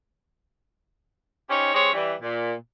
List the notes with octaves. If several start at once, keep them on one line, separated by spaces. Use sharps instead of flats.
C#4 D#4 G4 C5 C#5
G#3 C#4 G4 C5 C#5
E3 G3
A#2